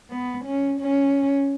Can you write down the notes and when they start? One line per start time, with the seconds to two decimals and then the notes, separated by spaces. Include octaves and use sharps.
0.11 B3
0.45 C#4
0.80 C#4